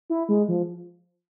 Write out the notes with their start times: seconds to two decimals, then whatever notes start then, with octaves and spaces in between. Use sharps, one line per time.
0.10 E4
0.29 G#3
0.48 F3